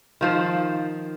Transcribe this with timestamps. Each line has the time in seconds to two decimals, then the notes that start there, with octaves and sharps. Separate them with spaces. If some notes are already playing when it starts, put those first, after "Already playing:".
0.21 D#3 F3 C5